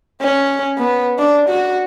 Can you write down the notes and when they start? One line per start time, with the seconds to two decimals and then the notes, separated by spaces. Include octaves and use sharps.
0.22 C#4
0.78 B3
1.18 D4
1.49 F#4